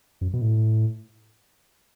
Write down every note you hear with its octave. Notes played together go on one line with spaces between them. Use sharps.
F#2
B2
A2